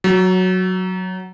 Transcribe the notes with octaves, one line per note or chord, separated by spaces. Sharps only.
F#3